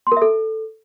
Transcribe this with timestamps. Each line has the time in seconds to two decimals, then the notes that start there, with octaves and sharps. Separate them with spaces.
0.07 C6
0.12 A#4
0.17 E5
0.22 A4